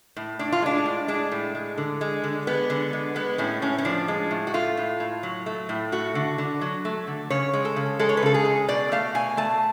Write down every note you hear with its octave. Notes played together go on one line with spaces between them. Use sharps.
A2
A2 D4
F4
G#3 D4
A2
G#3 D4
A2
G#3
D3
G#3
D3
G#3 B3
D3
G#3
G#3 B3
A2 C#4
A2 C#4
C#4
F3 D4
G#3
A2
F#4
A3 F4
A2
A2
F#3
A3
A2
A3 F#4
D3
D3
F#3
A3
D3
C#3 C#5
G#3
A4
C#3
G#3 A4
C#5
B4
C#3 A4
G#4
G#3
B2 D5
A3 F5
B2 G#5
A3 A5